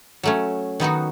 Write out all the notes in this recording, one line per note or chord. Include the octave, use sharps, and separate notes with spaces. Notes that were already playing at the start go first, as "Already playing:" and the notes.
F#3 A3 C#4
D#3 F#3 B3 D#4 F#4